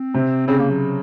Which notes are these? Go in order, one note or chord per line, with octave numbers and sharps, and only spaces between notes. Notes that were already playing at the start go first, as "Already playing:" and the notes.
Already playing: C4
C3
C#3 C4
A#3
F#3